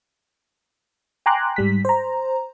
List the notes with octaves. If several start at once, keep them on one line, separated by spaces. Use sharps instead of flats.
G5 G#5 A#5 C6 D6 F#6
G#2 G3 B6
C5 A#5